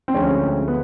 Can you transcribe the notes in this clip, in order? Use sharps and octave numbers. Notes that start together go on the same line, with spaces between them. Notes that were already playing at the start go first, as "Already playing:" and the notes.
C4
D2 D3 F3 G#3 C#4
B3